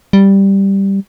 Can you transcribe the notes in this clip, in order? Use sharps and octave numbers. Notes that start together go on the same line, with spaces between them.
G3